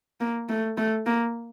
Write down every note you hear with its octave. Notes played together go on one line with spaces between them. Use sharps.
A#3
A3
A3
A#3